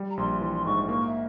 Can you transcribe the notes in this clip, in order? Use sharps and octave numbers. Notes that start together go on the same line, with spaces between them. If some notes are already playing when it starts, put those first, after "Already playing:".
Already playing: G3
A#5
A#1 C6
E3 C6
C6
G#2 C#6
A#3 C#6
E5